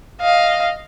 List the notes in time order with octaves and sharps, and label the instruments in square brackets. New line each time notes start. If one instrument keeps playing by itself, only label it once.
[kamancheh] D#5 F5